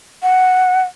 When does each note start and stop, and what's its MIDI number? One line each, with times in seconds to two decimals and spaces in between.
0.23 0.83 78